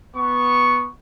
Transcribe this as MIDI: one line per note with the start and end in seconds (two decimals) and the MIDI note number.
0.15 0.87 59
0.15 0.87 85